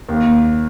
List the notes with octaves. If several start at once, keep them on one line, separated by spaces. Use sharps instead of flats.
D#2